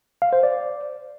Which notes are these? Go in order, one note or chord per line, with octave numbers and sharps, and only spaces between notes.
F5
C5
D5